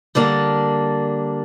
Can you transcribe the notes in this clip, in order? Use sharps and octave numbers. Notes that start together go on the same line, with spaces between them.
D3 G3 A#3 D4